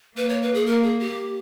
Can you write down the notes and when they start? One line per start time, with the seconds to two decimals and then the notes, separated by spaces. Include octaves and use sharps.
0.16 A#3 B4
0.29 C#5
0.42 B4
0.54 G#4
0.66 A#3 A#4
0.83 G#4
1.00 G4